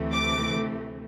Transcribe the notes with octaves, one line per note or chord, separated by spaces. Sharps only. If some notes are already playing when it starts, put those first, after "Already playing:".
Already playing: D2 C3 E3 A3
D6